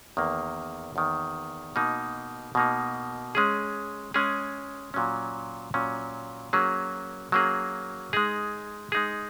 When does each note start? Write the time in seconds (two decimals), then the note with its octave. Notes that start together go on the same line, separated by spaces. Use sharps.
0.17 E2 D#3 A#3
0.96 E2 D#3 A#3
1.76 B2 A#3 D#4
2.55 B2 A#3 D#4
3.35 G#3 C#4 G#4
4.14 G#3 C#4 G#4
4.94 A#2 F#3 C#4
5.74 A#2 F#3 C#4
6.53 F#3 A#3 C#4 G#4
7.32 F#3 A#3 C#4 G#4
8.13 G#3 D#4 G#4
8.92 G#3 D#4 G#4